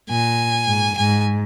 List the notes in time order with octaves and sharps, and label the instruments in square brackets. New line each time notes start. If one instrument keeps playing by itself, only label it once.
[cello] A#2 [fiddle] G#5
[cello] G#2
[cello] G#2 [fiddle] G#5